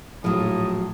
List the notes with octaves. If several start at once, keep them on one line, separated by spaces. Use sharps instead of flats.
A#1 A2 F3 F#3 D#6